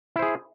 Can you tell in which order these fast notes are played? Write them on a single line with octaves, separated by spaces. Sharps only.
E4 C5 G#4